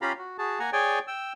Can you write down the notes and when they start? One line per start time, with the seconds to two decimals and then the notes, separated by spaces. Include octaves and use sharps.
0.02 C#4 F4 G4 F5 A#5 B5
0.18 F#4
0.38 F#4 G#4 A5
0.59 A#3 F#5 G#5 A#5
0.73 G#4 C#5 D5 G5 G#5
1.07 G5 E6